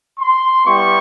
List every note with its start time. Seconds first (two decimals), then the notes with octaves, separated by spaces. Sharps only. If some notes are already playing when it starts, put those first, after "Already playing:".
0.19 C6
0.65 G3 B3 E4 G4 C#6